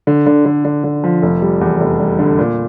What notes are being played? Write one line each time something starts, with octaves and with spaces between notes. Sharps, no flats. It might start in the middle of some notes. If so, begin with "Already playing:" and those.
D3
D3
D3
D3
D3
F3
F1
G3
E2
F1
G3
D3
A#2